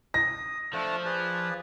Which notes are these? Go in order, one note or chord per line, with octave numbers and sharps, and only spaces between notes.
D#6 A#6
F3 A3 D4 A4
G#4 B4 D5